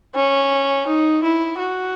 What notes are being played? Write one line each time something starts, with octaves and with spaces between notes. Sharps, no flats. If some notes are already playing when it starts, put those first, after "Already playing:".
C#4
D#4
E4
F#4